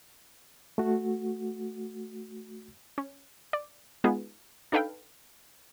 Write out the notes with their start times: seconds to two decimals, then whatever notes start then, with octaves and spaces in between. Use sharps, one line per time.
0.78 A3 F#4
2.98 C#4
3.53 D5
4.04 G#3 B3 D#4 F4 G#4
4.72 D4 D#4 A4 B4 F5 G5